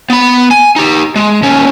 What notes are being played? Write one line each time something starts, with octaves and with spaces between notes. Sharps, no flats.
B3 B5
G#5
D#4 G4
G#3
D#2 C#4